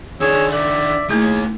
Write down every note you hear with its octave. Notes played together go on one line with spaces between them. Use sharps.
D#3 D4 G#4 C#5 E6
A4 D5 E5
A3 A#3 D#4 E4 G#4